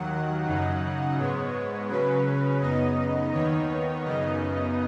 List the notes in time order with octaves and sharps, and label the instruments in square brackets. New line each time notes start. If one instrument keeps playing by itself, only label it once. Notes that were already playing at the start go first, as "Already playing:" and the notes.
Already playing: [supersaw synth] D#2 D#3 F#3 F#5
F#2 C#3 F#3 D#4
G#2 G#3 B3 C#5
C#3 F#3 C#4 B4
F#2 C#3 B3 D#4 D#5
D#2 D#3 B3 D#4 C#5
F#2 C#3 B3 D#4 D#5